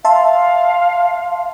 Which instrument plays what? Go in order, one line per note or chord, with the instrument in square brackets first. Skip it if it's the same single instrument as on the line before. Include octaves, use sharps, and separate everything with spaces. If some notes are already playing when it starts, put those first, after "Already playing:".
[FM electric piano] E5 A5 C6 [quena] F5